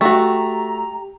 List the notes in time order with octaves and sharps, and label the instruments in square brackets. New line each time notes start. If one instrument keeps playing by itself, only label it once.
[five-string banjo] A3 F#4 [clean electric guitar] G4 [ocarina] A#5